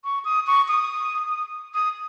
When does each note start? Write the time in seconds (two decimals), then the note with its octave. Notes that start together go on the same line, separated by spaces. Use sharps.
0.04 C#6
0.25 D#6
0.47 C#6
0.68 D#6
1.74 D#6